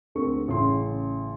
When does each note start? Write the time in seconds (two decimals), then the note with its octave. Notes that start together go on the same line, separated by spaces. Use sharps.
0.15 D2 D3 C4 A#4 C#6
0.48 A1 C#3 C6